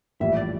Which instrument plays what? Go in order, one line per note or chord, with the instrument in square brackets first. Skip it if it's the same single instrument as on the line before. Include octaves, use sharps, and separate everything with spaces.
[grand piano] A#1 A2 E3 G3 [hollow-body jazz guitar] E5
[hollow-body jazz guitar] D5